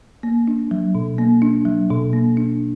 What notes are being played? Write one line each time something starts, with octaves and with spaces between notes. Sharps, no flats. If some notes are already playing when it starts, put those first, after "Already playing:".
A#3
D4
F#3
B2
A#3
D4
F#3
B2
A#3
D4